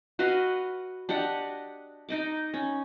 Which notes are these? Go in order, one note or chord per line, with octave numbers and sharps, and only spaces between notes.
F#4 B4 D#5 F5
D4 G4 D#5 F#5
D#4 D#5 D6
C#4